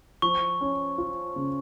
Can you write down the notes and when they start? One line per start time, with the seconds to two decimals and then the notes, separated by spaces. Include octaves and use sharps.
0.22 F3 C#6
0.61 C#4
0.98 F4
1.36 C#3